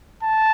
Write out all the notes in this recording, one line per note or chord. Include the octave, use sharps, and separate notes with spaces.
A5